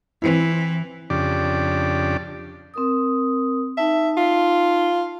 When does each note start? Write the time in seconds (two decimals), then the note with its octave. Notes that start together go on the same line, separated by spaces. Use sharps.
0.22 E3 C4 E4
1.10 F2 C#3 D4 G4 D5
2.74 C4 A#4 D#6
3.77 D#4 E5 A5
4.17 F4